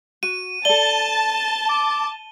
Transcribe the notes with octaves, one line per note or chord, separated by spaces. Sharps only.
F#4 D#7
A4 D5 A5 G7
D6